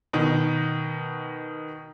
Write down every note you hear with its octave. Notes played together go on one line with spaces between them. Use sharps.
B2 D#3